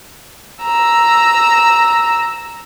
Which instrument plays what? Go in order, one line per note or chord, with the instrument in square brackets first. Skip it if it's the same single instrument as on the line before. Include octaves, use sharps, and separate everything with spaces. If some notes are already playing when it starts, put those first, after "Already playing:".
[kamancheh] A#5 E6